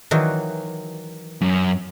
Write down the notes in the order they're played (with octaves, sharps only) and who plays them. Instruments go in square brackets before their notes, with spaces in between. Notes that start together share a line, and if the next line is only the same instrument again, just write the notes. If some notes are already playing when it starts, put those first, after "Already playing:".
[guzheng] D#3 E3 F#3
[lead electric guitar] F#2